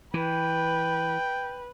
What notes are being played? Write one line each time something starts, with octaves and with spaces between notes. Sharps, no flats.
E3 B4 G5